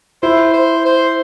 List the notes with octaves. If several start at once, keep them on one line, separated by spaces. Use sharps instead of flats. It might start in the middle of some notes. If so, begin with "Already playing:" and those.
E4 C5
C5
C5